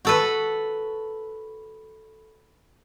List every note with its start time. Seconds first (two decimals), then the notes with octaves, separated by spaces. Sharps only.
0.05 F#4 A4 B4